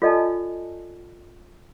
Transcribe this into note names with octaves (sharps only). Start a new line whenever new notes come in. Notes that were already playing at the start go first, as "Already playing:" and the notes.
F4 A4 D5 D#5 G#5 A5